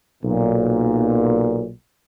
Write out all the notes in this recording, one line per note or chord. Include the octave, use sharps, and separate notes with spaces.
B1 A#2